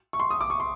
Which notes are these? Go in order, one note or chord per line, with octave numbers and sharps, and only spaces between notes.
C#6
C6
D#6
D6
C#6
C6